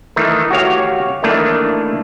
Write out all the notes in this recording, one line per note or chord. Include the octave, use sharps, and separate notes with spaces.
D#3 E3 A3
F#4 G4 C#5 F5
D#3 E3 A3 A#3 D4